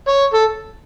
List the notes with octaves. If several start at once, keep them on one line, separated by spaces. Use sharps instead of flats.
C#5
A4